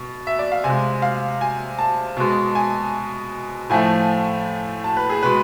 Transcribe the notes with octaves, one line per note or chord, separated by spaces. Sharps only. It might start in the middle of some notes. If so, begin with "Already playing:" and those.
Already playing: B2
E5
D5
F5
C3 G#5
G#3
F5
G#5
A5
B2 G#3
G#5
A2 F3 A3 G#5
A5
B4
G#4
B2 G#3 B4